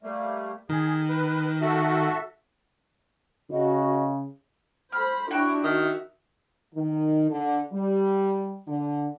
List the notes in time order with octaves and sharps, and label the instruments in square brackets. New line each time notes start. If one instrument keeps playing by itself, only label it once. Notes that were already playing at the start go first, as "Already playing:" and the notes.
[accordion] G3 A3 A#3
[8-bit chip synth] D#3 [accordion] G#4
[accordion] B4
F#4 A4 E5
[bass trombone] C#3 [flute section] F#4 D#5
[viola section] A4 C5 B5 [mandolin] F6
[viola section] D4 E4 C#5 [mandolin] F#4 G5 F#6
[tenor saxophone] D#3 [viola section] F#4 E5 [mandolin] D#6
[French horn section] D#3
D3
G3
D3